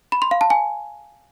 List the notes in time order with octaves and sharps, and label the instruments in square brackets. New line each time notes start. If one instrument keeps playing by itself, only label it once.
[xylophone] B5
C6
F5
A5
G#5